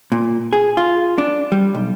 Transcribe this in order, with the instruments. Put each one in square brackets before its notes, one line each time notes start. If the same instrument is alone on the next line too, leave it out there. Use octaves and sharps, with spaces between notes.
[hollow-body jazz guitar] A#2
G#4
F4
D4
G3
B1